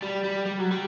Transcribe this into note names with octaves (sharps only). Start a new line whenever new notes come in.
G3
G3
G3
F#3
G3